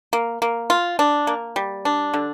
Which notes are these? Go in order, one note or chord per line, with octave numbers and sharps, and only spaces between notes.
A#3
A#3
F4
D4
A#3
G3
D4
D3